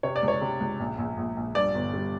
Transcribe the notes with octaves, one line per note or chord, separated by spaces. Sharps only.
C3 C#5
D5
C#2
C#5
C3
C#2
A#1
A#1
A#1
A#1
G2 D5
G1
G3